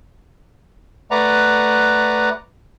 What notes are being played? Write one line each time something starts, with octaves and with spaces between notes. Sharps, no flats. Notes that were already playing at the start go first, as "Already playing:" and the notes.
A3 B4 D5 F#5 A#5